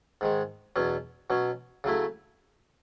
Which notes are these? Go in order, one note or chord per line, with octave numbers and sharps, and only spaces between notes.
G#2 D#3 G#3
E2 B2 F#3 C#4
B2 F#3 C#4
C#3 F#3 A3 E4